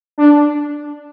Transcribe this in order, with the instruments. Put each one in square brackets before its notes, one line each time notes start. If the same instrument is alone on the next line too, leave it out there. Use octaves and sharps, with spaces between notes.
[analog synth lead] D4